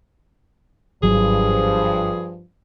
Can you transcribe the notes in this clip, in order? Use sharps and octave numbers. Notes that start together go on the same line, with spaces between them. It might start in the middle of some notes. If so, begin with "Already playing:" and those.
G#1 G2 F3 F#3 G#4